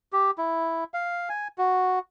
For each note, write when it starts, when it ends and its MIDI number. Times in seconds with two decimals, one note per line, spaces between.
0.13 0.31 67
0.38 0.84 64
0.94 1.29 77
1.29 1.48 80
1.58 1.99 66